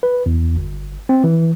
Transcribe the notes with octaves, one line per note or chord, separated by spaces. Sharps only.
B4
E2
G1
C4
E3